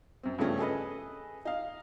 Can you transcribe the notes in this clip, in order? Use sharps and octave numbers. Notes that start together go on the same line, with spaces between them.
F#2 C4
G2 C#3 F3 A3 C#4
G#4 A4 B4 D#5
D#4 F5